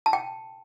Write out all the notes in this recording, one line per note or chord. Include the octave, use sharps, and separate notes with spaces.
A5
G5